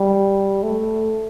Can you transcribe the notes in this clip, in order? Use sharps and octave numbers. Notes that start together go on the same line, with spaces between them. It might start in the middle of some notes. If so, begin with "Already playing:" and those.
Already playing: G3
A3